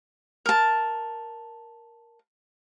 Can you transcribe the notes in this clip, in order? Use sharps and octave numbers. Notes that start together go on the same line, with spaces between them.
A#4 A5